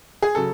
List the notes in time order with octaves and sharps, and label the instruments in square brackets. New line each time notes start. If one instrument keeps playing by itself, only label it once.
[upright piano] G#4
C#3 F#3 A4